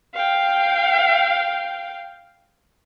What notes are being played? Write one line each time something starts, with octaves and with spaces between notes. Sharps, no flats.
F5 G5